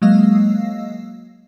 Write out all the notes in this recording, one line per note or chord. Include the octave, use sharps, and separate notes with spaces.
F#3 G#3 A#3 D#5 F5 E6